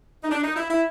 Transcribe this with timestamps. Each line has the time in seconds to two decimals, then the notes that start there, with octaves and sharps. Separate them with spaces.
0.23 D#4
0.30 D4
0.43 D#4
0.56 E4
0.69 E4